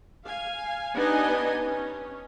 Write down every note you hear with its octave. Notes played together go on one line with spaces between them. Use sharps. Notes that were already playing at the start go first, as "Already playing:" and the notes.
F5 G#5
B3 D4 D#4 G4 D#5 G#5
C#4